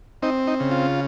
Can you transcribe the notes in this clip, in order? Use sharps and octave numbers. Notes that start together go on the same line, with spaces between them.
C4 D#4
D#4
C#3
F4